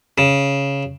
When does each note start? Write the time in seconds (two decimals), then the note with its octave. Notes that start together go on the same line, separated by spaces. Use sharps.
0.18 C#3